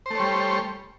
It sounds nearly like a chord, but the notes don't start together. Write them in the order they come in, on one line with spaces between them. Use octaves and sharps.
C5 A3 C#5 G3